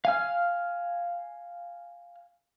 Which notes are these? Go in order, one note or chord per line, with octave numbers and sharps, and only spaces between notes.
F5 G#5 F6